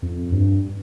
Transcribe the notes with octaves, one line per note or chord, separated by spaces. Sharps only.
F2
G2